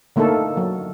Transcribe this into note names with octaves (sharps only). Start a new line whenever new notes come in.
D3 A3 A#3 D#4 A4
F#3